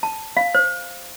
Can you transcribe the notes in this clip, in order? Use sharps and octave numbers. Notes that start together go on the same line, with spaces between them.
A5
F5
C5